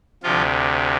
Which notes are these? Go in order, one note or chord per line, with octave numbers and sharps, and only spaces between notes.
D2 C3 F3 F4